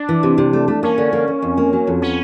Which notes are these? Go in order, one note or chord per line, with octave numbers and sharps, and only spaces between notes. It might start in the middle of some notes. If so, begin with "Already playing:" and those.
Already playing: D4
E3
C3
C3
A3
A3
A#3 C#4
D3
A#3
A#3
F2
A#3
F#3
F2
B3 C#4